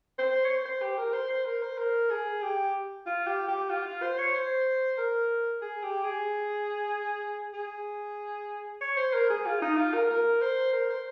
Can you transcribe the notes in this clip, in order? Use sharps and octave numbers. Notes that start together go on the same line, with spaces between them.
C5
C#5
C5
C5
G4
A#4
C5
C5
A#4
C5
A#4
G#4
G4
F4
G4
G4
F4
F4
C5
C#5
C5
A#4
G#4
G4
G#4
G#4
C#5
C5
A#4
G#4
F4
D#4
F4
A#4
A#4
C5
A#4
C5